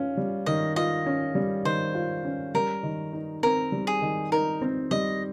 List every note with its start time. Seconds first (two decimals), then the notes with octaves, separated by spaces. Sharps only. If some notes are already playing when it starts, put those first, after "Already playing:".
Already playing: C#4 F4
0.17 G3
0.46 D#3 D#5
0.76 F4 D#5
1.06 C#4
1.35 G3
1.65 D#3 C5
1.95 F4
2.25 C#4
2.54 G3 A#4
2.83 D#3
3.13 D#4
3.43 C4 A#4
3.72 G3
3.87 G#4
4.02 D#3
4.32 D#4 A#4
4.62 C4
4.91 G3 D#5